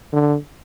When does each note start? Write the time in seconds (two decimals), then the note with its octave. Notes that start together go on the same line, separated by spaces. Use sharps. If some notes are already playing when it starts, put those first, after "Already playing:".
0.13 D3